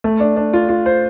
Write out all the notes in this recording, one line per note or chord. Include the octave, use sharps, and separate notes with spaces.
A3
D4
D4
F4
F4
C5